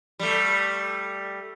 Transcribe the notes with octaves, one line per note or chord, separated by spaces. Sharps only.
G3 A3